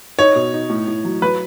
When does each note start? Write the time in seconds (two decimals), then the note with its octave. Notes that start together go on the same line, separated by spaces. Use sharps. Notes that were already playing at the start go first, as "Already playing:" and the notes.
0.19 D#4 C#5
0.36 B2
0.53 D#4
0.70 A2
0.87 A2
1.05 F#3
1.22 F#3 B4